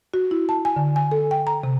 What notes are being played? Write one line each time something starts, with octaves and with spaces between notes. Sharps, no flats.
F#4
E4
A5
G#5
D3
G#5
A4
G5
A#5
C3